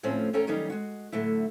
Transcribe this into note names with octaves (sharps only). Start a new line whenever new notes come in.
D2 A2 F3 C4 C#4
E2 C#4 A4 G5 A#5
D#3 F#3 G3 C#4 D#4
G#3 F#4
A2 D3 F#3 A3 E4